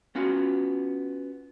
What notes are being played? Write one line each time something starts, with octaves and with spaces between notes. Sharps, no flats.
B3 C#4 F4 F#4